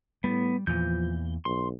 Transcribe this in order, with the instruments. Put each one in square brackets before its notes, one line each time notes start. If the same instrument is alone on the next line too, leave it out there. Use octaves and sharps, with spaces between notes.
[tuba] A2 [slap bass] G3 [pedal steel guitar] B3
[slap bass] E2 A#2 E3 [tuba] F3 [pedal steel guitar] G6
[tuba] B1 [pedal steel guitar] C6